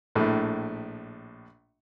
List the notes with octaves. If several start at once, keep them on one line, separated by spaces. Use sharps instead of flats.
A#1 A2